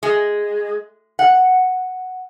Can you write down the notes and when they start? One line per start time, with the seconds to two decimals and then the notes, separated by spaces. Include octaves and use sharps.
0.03 G#3
1.19 F#5